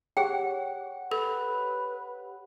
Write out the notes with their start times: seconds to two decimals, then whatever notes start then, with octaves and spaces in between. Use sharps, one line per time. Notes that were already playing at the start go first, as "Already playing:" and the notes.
0.17 G4 G#4 C#5 F#5 G5
1.12 A4 B4